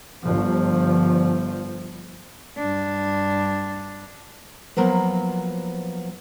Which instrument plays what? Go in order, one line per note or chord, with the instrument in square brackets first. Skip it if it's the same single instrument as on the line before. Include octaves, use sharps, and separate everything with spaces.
[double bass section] G1 F3
[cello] G2 D4
[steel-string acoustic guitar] F3 F#3 A#3 B3